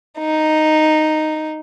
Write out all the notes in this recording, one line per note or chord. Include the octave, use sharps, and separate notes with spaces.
D#4